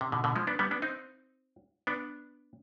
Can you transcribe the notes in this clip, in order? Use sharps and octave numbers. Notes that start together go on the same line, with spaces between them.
C3
B2 D3
B2 D3
F3 G#3
B3 D4
G3 B3
B3 D4
C4 D#4
B3 D4